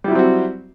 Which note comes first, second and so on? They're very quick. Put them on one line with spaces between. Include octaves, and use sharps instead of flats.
G3 E4 F#3 C4 F#4